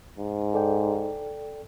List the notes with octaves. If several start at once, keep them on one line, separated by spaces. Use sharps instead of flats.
G#2
A4 D5 G5